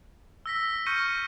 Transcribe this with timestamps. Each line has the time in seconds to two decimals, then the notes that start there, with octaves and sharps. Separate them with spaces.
0.46 E6 A#6 B6
0.86 C#6 F6 G6 A#6 C#7 D#7